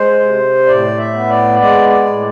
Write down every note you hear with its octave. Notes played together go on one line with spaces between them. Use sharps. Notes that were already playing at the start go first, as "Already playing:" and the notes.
Already playing: G#3 C5
C3
A2 D5
E5
B3
D5
G#3 D5
D5
A2